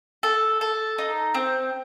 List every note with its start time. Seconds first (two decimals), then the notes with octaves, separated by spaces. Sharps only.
0.23 A4
0.61 A4
0.98 D#4
1.34 C4